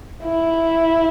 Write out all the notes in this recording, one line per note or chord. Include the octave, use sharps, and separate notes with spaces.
E4